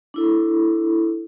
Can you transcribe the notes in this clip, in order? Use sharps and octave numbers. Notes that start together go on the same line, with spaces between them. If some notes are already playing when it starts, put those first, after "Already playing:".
D4 E4 A4